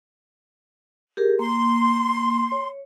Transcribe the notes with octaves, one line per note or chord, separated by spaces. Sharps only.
G4 G#4 A#4
A#3 C6
C#5